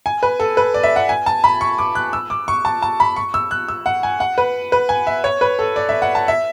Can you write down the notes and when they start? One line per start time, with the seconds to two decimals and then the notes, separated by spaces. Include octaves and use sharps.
0.06 G#5
0.23 B4
0.40 A4
0.57 B4
0.74 D5
0.84 E5
0.96 F#5
1.09 G#5
1.26 A5
1.44 B5
1.61 C#6
1.78 D6
1.95 F#6
2.13 E6
2.30 D6
2.48 C#6
2.65 A5
2.82 A5
3.00 B5
3.16 C#6
3.34 E6
3.51 F#6
3.68 E6
3.86 F#5
4.03 G#5
4.20 F#5
4.38 B4
4.72 B4
4.89 G#5
5.07 E5
5.24 C#5
5.41 B4
5.59 A4
5.76 D5
5.89 E5
6.02 F#5
6.15 A5
6.28 E5